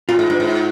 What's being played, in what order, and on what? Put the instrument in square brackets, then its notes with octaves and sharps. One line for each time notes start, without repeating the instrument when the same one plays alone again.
[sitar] A2 [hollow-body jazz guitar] F4
[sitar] G#2
G2
G#2